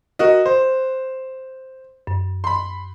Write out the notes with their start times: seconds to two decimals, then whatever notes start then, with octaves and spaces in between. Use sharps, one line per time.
0.19 F#4 A#4 D#5
0.46 C5
2.07 F#2
2.44 B5 C6